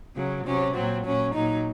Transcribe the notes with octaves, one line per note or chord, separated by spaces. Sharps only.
C#3 F#3
C3 F#3 C#4
A#2 F#3 C4
A#2 F#3 C#4
A#2 F#3 D#4